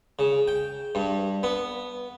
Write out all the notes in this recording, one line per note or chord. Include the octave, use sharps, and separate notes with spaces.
C#3
G5
G2
B3